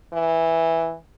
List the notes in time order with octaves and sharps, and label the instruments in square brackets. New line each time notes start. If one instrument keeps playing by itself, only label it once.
[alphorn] E3